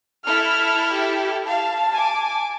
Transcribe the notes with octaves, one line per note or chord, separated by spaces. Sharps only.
E4 A4 F6
G4
F5 A5
G#5 D6